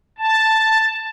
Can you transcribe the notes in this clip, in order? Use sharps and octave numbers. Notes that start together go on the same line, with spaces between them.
A5